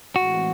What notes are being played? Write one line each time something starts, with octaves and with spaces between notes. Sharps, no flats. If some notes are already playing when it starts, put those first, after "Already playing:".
A2 E3 G#3 C4 F#4